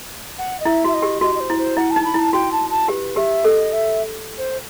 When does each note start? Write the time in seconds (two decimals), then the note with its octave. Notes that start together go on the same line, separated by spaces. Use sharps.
0.38 F#5
0.60 D#5
0.65 E4 E5
0.84 F#4 E5
0.93 D#5
1.02 G4
1.21 F#4 D#5
1.35 D#5
1.40 C5
1.50 E4
1.58 C5
1.77 E4 F#5
1.91 A5
1.96 D#4
2.05 B5
2.14 E4 A5
2.33 F#4 G5
2.52 A5
2.70 A5
2.88 G4 B4
3.16 G4 E5
3.44 A4 D#5
3.72 E5
4.38 C5